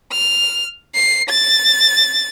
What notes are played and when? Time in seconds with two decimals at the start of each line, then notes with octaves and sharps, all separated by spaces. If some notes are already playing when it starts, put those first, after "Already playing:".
0.12 F6
0.95 C7
1.29 A6